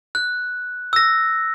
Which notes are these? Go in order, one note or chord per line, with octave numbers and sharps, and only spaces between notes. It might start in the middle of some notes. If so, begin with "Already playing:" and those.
F#6
E6 A#6